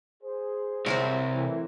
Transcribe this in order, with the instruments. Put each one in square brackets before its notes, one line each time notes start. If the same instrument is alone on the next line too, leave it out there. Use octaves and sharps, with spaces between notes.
[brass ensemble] G#4 C5
[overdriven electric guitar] C2 [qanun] C4 A#4 C#5
[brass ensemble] A2 E3